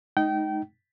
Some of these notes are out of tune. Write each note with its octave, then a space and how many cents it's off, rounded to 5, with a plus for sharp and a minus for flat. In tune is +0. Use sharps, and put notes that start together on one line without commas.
G#3 +40 D#4 +0 G5 -30